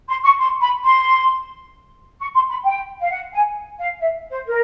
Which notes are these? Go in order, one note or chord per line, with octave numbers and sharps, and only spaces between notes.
C6
C#6
C6
B5
C6
C#6
C6
B5
G5
F5
F#5
G#5
F5
E5
C5
A#4